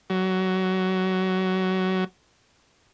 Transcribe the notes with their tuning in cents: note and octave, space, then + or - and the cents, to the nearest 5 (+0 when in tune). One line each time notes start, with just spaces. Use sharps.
F#3 +20